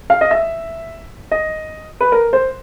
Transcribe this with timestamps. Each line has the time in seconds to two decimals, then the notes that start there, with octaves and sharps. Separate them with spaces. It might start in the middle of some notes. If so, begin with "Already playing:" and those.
0.10 F5
0.21 D#5
0.31 E5
1.31 D#5
2.01 B4
2.12 A#4
2.33 C5